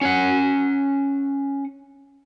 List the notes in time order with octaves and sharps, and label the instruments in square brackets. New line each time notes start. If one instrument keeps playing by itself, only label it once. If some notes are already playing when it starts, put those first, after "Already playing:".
[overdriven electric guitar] C#4 F#5